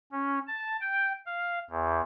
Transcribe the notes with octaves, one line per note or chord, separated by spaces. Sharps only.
C#4
A5
G5
F5
E2